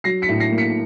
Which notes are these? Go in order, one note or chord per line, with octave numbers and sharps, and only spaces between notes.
F#3 A#6 C7
B6 C#7
A2
A#6 C7
A#3
B6 C#7